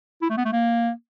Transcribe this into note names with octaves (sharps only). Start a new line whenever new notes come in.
E4
A3
B3
A3
A#3